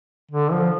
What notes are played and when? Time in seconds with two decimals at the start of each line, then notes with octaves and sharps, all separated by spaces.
0.31 D3
0.52 F3